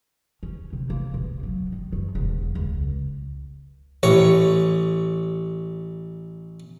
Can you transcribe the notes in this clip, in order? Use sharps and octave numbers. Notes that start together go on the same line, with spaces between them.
C#4
C3
A#3
B1
F#3
D#3
F#2
E1
C#2
A1 C#5 A#5